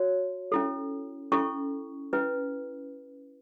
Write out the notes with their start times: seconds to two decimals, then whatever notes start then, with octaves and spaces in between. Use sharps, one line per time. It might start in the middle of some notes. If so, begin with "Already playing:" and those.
Already playing: F#4 C#5
0.52 C#4 E4 A4
1.32 C#4 E4 A4 C#6
2.13 C#4 E4 B4